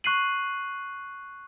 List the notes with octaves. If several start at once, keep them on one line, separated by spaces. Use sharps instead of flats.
C#6 F#6 C7 D#7 F#7